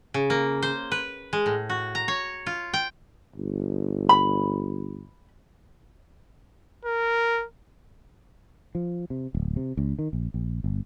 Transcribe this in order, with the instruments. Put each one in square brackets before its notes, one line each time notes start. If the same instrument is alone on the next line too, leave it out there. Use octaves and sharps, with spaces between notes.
[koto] C#3
A#3
C5
B4
G#3
A2
F#4
A#5
C#5
F4
G5
[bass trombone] G1
[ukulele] B5
[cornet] A#4
[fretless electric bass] F3
C3
D1
C3
C#2
D#3
A#1
A#1
G1